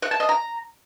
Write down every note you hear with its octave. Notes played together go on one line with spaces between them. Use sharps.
F#5
A5
D#5
A#5